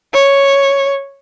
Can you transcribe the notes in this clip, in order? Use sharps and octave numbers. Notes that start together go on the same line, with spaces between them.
C#5